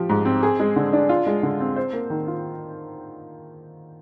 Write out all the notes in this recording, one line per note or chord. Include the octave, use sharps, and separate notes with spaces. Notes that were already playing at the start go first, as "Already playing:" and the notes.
Already playing: F3 G4
G#2
C4
G#4
G#3
D3
D4
F4
G#3
D3
C4
C5
A#3
D#3
F4